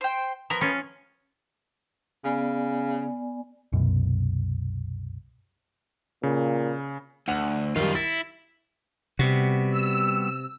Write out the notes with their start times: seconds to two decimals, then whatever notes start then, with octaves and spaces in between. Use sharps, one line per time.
0.01 C5 G5
0.50 F3 B3 A#4
0.61 C#4 F4
2.24 C#3 B3 D5 G#5
3.73 C2 F#2 B2
6.23 A#2 C#3
7.28 D2 F#5
7.76 F#2 D#3 G3 F4
7.95 E4 A6
9.19 C3 G3 B3 F#4
9.71 E6